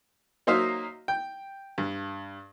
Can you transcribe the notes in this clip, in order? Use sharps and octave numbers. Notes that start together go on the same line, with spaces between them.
F#3 A#3 D#4 C5 E5 F5
G5
G2